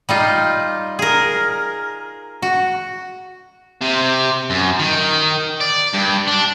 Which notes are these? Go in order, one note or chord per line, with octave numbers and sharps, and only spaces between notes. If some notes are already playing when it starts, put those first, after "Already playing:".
G3 D#4 F4
G#4 A#4
F#4
C3
F#2
D#3
D5
G2
D4